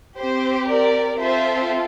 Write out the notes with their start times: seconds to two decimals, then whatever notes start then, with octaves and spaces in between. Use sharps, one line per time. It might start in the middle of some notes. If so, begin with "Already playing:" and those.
0.18 C4 G4 C5
0.68 A#4 D5
1.18 C4 F4 A4 C5 E5